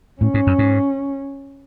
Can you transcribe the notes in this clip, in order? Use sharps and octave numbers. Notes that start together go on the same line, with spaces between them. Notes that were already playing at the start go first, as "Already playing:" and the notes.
A2 C#4
G#2
F#2
G#2